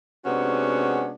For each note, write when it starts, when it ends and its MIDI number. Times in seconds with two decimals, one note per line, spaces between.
0.25 1.14 48
0.25 1.14 56
0.25 1.14 59
0.25 1.14 61
0.25 1.14 62
0.25 1.14 66